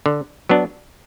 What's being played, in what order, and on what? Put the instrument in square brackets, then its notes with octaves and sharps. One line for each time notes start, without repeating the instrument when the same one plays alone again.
[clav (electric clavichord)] D3
F#3 B3 D4